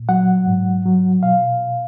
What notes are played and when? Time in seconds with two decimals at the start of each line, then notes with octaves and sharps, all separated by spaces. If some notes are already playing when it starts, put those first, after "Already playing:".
Already playing: A#2
0.09 F#3 F#5
0.47 G#2
0.85 F#3
1.23 B2 F5